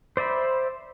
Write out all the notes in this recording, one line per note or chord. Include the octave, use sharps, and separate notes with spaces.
C5 D5 E5 B5